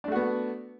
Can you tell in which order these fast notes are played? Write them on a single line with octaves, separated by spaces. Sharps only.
D4 A3 F#4 B3